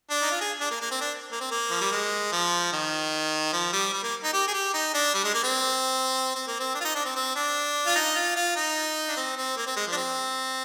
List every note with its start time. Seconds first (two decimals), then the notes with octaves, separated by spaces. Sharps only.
0.11 D4
0.22 D#4
0.31 F4
0.41 G#4
0.61 D4
0.71 A#3
0.81 A#3
0.91 C4
1.01 D4
1.32 A#3
1.41 C4
1.51 A#3
1.71 F3
1.81 G3
1.92 G#3
2.32 F3
2.73 D#3
3.53 F3
3.73 G3
3.93 G3
4.03 A#3
4.24 D#4
4.33 G4
4.47 G#4
4.54 G4
4.74 D#4
4.94 D4
5.14 G3
5.24 G#3
5.34 A#3
5.44 C4
6.35 C4
6.47 A#3
6.60 C4
6.75 D4
6.80 F4
6.85 D#4
6.95 D4
7.05 C4
7.16 C4
7.36 D4
7.87 F4
7.95 D#4
8.16 F4
8.36 F4
8.56 D#4
9.08 D4
9.17 C4
9.37 C4
9.57 A#3
9.66 C4
9.76 G#3
9.87 F3
9.92 D4
9.97 C4